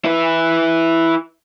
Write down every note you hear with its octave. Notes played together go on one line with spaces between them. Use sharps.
E4 B4